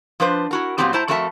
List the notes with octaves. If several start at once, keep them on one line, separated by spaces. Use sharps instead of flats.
F3 D4 B4 C5
E4 F#4 A#4
A#2 E3 F#3 B3 C4 G4
A2 E4 C5 A5 A#5
F2 A3 F#4 A#4 E5 A5